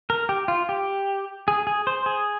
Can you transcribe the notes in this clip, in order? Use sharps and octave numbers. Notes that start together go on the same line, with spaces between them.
A#4
G4
F4
G4
G#4
G#4
C5
G#4